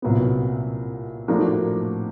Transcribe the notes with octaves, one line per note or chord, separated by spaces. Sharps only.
C2 A#2 F#3 B3
A2 F3 A#3 D4 F#4